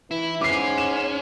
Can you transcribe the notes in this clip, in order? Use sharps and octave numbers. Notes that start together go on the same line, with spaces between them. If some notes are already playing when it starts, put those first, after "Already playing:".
E3 E4
G#2 C#4 D6 C7
E7